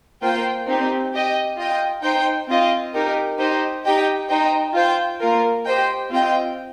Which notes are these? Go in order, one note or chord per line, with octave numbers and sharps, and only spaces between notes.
A#3 F4 C5 G5
C4 D#4 G4
G4 D#5 G5
F4 D#5 G5
D#4 C5 G5
C4 F4 D#5 G5
D#4 G4 A#4
D#4 G4 C5 D#5
D#4 G4 D#5 G5
D#4 C5 D#5 G5
F4 C5 G5
A#3 F4 A#4
G4 C5 D#5 G5
C4 F4 D#5 G5